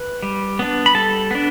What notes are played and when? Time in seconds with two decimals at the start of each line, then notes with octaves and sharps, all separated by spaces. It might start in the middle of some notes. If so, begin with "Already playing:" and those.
Already playing: B4
0.23 G3
0.59 B3 D4
0.86 B5
0.95 G3 A4 A5
1.31 B3 D4